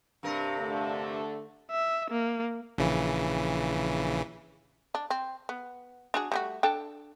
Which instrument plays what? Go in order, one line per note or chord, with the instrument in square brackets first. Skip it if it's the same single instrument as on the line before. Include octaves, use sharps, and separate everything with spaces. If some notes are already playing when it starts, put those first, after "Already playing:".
[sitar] G2 C3 A#4
[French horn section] D3 A3
[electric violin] E5
A#3
[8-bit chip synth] A#1 C#3 E3
[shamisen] D4
C4
B3
D4 F#4 G#4
G3 A3 F#4
D4 A4 G5